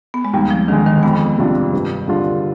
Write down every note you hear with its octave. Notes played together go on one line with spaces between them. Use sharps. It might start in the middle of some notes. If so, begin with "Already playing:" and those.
B3
G#3
D#2 G3
F3
D3 D#3 G#3
D#3
F2 B3
C3 G3 D4 F4
G2
D3 G3 D4 F4